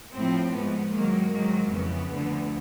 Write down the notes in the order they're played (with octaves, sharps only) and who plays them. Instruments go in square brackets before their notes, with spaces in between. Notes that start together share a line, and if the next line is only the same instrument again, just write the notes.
[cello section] A2 F3 C4
G#2 F3 B3
G#2 D#3 F#3 A#3
G#2 D#3 F#3 A#3
F2 C#3 E3 B3
D2 D3 F3